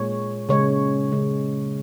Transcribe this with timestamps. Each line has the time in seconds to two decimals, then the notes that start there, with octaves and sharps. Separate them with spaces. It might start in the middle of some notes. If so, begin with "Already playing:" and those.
Already playing: A#2 G#3 C#5
0.49 C#3 G#3 C#5
1.12 C#3 G#3